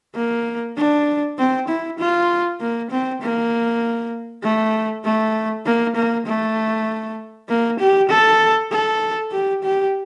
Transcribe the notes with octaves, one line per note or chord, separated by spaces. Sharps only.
A#3
D4
C4
E4
F4
A#3
C4
A#3
A3
A3
A#3
A#3
A3
A#3
G4
A4
A4
G4
G4